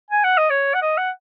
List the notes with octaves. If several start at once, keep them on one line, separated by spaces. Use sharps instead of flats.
G#5
F#5
D#5
C#5
F#5
D#5
F#5